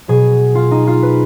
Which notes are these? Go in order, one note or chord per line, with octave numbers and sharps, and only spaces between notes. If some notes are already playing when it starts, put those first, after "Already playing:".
B2 F#3 G#4
F4
D#4
F4
B4